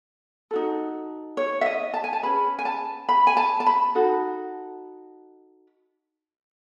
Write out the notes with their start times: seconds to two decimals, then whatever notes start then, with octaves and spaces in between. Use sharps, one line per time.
0.51 D#4 F#4 A4
1.37 C#5
1.61 E5
1.66 D#5
1.94 A5
2.04 G#5
2.13 A5
2.23 C#4 G#4 B4 B5
2.59 G#5
2.65 A5
3.09 B5
3.27 G#5
3.37 A5
3.60 A5
3.66 B5
3.95 D#4 F#4 A4